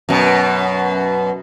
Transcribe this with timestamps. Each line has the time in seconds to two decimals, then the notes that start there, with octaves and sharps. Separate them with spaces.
0.09 F#2 B2